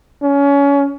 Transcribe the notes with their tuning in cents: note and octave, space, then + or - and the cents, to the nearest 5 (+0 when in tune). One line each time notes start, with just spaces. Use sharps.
C#4 +25